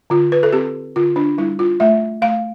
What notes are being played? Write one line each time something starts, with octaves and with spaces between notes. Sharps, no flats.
D3 F4
B4
A4
C4 G4
D3 F4
D4
G3 E4
F4
A3 E5
A3 F5